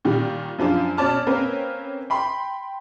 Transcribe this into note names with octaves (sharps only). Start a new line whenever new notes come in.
A#2 D#3 G3
F#2 F3 D4 F4
B2 C#4 D5 A5 F6
A#3 C4 C#4 A#4 B4
G5 B5 C6